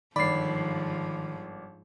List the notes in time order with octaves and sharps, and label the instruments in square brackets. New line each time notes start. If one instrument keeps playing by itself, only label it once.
[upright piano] G1 D5 [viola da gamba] G#2 F3 [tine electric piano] D#3 [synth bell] B5 C7